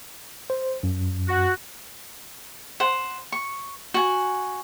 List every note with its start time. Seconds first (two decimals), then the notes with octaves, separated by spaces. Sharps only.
0.50 C5
0.83 F#2
1.28 F#4
2.80 C5 F#5
3.32 C#6
3.94 F#4 G#5